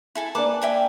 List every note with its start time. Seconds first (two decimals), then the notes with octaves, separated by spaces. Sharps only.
0.15 E4 A4 G#5
0.35 A#3 D4 B4 A5 D6
0.62 E5 G5 G#5